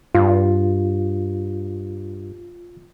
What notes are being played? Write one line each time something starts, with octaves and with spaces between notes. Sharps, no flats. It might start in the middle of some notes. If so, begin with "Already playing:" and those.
G2 F4